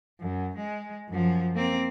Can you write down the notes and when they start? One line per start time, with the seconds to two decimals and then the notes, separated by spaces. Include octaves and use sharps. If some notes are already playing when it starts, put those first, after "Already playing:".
0.20 F#2
0.57 G#3
1.09 F#2 F3
1.55 A#3 C4